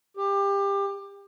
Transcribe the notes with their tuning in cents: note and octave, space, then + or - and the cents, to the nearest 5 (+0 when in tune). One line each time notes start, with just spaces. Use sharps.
G4 +25